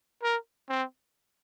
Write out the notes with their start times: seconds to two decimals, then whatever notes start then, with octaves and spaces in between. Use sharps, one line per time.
0.22 A#4
0.69 C4